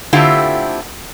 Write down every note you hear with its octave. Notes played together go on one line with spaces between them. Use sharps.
D3 A3 C4 E4 F4 G4